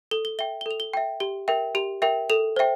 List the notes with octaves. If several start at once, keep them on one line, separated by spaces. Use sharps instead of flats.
A4 G7
G7
E5 G5 G7
G7
A4 F7
G7
E5 G5
G4 G7
A#4 E5 G5
G4 F7
A#4 E5 G5
A4 F7
C5 E5 G5